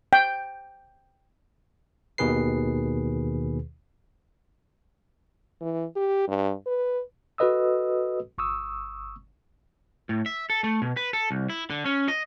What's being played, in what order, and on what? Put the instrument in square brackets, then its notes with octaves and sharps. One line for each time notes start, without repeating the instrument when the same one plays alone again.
[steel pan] G5
[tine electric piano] D#2 B2 D#3 G#4 B4 C7
[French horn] E3
G4
G2
B4
[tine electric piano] F#4 A4 B4 D#5 D#6 E6
G1 C#6 D#6 E6
[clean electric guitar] A2
E5
A4
A3
B2
B4
A4
C2
E4
D3
C#4
D#5